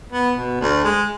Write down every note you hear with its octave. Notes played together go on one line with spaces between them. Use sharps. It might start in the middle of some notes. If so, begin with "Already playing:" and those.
B3
B2
D2
G#3